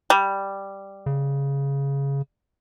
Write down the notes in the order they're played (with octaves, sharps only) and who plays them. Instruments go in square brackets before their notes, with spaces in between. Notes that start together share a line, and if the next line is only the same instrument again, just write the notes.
[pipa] G3
[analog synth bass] C#3